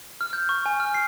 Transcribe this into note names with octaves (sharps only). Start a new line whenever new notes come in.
F6
G6
C#6
G#5
F6
C7